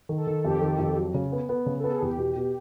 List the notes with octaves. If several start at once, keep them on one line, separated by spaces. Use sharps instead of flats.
D#3
A4
D#3
F2 G4
D#3
F2
F#3
C#3
B3
B3
C#3
B3 A4
G#4
E2 G4
B2
B2